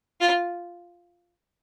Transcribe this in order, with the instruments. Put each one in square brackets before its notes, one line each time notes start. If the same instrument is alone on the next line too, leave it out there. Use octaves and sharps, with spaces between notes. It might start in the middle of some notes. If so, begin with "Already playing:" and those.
[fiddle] F4